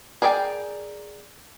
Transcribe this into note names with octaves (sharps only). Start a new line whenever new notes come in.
G#4 A#4 D5 E5 G5